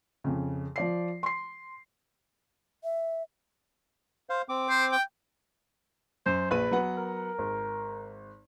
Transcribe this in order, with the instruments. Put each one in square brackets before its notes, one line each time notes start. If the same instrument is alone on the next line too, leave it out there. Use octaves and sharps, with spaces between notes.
[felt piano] F2 C#3
F3 D5 C7
C6 C7
[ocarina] E5
[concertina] C5 F5
C4 D6
[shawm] C5
G5
[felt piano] F#2 [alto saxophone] C5
[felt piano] A#1 B5 D#7 [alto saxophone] B4
[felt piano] F#3 B3 F#5
[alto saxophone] A#4
[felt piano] G#1